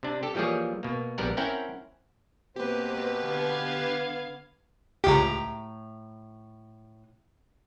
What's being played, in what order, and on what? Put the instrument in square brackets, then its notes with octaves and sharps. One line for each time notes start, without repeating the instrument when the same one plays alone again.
[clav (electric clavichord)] C3 D4
G4 A4
E3 F3 G3 A#3 G#4 C#5
B2 A#3
A#1 G3 B3 A#4 F#5
C4 C#4 E4 A#4 F#5 G5
[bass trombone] B2 [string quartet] A#3 C4 [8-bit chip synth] G4 B4
[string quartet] D3 G#6 [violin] B3 F5
[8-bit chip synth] C#2 G4 [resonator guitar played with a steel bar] A2 A#5